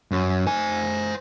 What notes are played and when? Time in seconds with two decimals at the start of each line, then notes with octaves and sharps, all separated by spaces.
0.11 F#2
0.46 C5 G#5